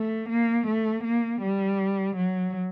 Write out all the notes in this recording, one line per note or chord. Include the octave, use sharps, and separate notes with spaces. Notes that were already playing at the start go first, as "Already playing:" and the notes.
Already playing: A3
A#3
A3
A#3
G3
F#3